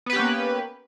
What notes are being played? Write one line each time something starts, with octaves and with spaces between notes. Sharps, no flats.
A#3 B3 C#4 G4 B4